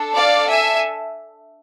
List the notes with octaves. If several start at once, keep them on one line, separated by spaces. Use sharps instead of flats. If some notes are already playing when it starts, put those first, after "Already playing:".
Already playing: D4 A4
D5 F5
E5 G#5